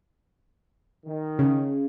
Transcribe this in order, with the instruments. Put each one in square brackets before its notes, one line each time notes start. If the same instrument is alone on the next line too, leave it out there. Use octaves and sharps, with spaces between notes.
[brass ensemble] D#3
[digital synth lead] C#3